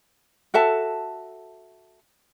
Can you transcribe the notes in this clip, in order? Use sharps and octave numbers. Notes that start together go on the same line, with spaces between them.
F#4 A4 E5 A5